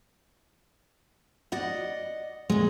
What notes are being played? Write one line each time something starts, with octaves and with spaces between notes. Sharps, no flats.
D5 D#5 F#5
A#2 G#3